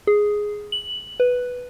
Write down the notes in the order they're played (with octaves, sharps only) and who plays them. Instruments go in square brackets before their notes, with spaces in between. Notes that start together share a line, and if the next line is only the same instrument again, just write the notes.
[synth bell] G#4
F#7
B4